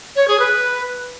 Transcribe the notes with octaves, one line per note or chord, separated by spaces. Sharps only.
C#5
G#4
B4